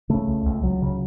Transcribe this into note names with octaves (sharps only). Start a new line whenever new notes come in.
C#3 A3
C#2
C#2
C#2 F#3
C#3